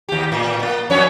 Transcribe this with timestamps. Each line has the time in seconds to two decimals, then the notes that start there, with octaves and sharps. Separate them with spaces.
0.08 D#2 G4
0.32 A2
0.63 A#3
0.90 F2 C#4 C#5